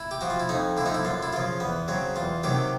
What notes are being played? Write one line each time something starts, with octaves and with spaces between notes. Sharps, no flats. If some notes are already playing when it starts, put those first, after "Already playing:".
Already playing: E4
G4
F3 F#4
F4
E4
F2 D#4
D3 F3 E4
D#4
E4
F#2 F4
E4
C#3 F3 F4
E2 B3
C#3 F#3 C4
E2 F4
C3 D#3 F#3 G4